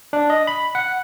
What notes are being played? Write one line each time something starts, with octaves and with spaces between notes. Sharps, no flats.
D4
D#5
B5
F#5